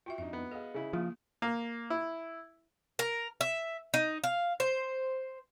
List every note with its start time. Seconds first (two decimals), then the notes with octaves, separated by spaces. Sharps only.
0.06 F4 F#4 E5 G5
0.18 F2 D4 D#4 E5
0.33 B3
0.51 G#4 A4 D#5 F5
0.74 C#3 E4
0.93 F3 A#3 F4 D#6
1.42 A#3
1.90 E4
2.99 A#4
3.41 E5
3.94 D#4
4.24 F5
4.60 C5